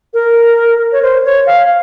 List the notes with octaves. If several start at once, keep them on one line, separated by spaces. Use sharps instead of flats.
A#4
C#5
C5
C#5
F5